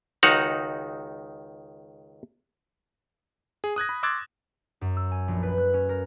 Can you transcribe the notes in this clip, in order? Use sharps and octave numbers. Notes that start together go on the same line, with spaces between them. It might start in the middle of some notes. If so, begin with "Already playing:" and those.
C#2 D#3 D#4 F#4 F#5 A#5
G#4
D#6 F#6 G#6 A#6
B5
C6 D6 E6 F#6 G#6 A6
F#2
E6
G#5
A#1
B4
F#6
C#4
A#4